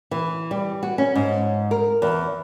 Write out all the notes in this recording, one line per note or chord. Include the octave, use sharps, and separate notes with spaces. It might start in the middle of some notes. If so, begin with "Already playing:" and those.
E3
G3
F#4
C#4
G#2
A#4
E2